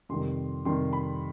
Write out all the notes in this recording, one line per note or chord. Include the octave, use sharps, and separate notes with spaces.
F2 C3 D#3 G3 C6
F2 C3 D#3 G3 C6
B5